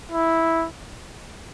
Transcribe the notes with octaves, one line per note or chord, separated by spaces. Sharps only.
E4